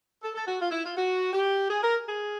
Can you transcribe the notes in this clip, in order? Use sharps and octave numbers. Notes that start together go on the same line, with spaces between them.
A4
A4
F#4
F4
E4
F4
F#4
G4
G#4
A#4
G#4